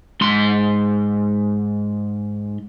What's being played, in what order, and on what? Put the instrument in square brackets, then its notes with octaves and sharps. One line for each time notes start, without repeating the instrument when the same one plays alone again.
[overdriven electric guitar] G#2 C6